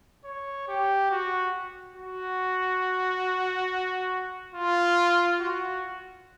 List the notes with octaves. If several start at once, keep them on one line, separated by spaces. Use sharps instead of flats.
C#5
G4
F#4
F#4
F4
F#4